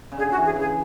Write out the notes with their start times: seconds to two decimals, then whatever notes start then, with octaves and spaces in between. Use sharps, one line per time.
0.12 C#3
0.17 D3 G#4
0.31 F#4
0.37 E3
0.45 G#4
0.56 C#3 G#4